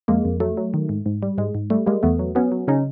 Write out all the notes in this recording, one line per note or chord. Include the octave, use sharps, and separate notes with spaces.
F2 G#3 A#3
F2
F#3 A3
F#3
D#3
G#2
G#2
G3
G#2 G#3
G#2
G3 A3
G3 G#3 A#3
E2 A3 B3
F#3
F#3 B3 C#4
F#3
C#3 C#4 D#4